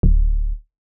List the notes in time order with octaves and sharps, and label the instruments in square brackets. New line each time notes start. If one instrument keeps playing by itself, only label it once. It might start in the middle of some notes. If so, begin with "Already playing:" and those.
[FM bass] D1